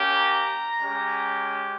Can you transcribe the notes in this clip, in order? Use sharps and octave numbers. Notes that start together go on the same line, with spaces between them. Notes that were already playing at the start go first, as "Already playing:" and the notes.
Already playing: A#3 C#4 G4
A#5
G#3 C#4 G4